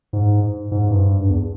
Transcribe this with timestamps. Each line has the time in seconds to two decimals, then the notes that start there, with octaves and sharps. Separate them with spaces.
0.13 G#2
0.71 G#2
0.91 G2
1.29 E2